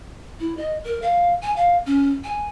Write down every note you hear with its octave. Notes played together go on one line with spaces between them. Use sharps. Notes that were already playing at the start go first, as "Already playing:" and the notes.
E4
D#5
A#4
F5
G#5
F5
C#4
G#5